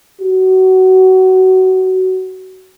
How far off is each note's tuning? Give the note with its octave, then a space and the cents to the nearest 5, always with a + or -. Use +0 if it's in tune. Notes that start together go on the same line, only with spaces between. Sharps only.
F#4 +20